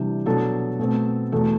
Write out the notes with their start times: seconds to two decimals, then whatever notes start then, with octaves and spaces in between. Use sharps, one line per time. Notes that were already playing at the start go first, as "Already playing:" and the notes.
Already playing: C3 E3 G3 D4 G4
0.26 B2 F#3 B3 D4 A4
0.79 B2 A3 C4
1.32 E2 B2 A3 A4